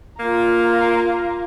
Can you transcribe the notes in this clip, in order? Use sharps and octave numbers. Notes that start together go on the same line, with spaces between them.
A#3 F4 A#5